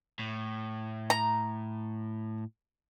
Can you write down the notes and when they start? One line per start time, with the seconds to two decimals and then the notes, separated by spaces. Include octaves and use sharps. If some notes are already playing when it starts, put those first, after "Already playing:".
0.19 A2
1.10 A#5